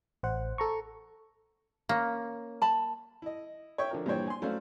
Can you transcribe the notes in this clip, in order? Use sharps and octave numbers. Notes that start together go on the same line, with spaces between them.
A1 C5 F#5
A4 A#5 C#6
A#3 C#4
A5 B5
E4 D#5
C#5 E5 G5 C#6
D3 F3 A#4
G2 A#2 E3 C5 C#5 G5
G#5 C6
F#3 A3 C#4 C5 D5 F5